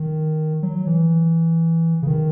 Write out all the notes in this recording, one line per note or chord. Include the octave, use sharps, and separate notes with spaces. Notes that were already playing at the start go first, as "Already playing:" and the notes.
Already playing: D#3
F#3
E3
C#3
D#3